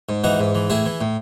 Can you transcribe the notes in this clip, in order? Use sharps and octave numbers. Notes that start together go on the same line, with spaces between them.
G#2
E3 D#4 F#4
G#2
E3
A2 E4 G#4
E3
A2